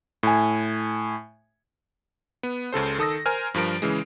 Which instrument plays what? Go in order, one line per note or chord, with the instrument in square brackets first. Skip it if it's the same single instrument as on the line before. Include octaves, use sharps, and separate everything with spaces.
[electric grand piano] A2 G#5
B3
C#2 C#3 A4 C5
D#3 A4 D#6 E6 A#6
A#4 C5 G#5 F6
G2 F3 A#4 D7
C#3 E3 G#3